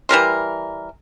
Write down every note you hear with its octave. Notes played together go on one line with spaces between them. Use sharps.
E3 G3 A#4 C6